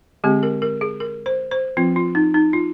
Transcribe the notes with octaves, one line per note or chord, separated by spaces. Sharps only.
D3 G#3 C4 G4
A#4
A#4
G#4
A#4
C5
C5
F3 C4 F4
F4
D#4
D#4
F4